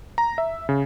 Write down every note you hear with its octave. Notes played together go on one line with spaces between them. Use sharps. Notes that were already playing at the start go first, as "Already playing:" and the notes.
A#5
E5
C#3